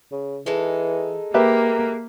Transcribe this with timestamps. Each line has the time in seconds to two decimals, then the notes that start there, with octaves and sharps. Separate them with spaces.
0.12 C#3
0.46 E3 G#3 D#4 A4
1.34 A#3 G4 A#4 B4 E5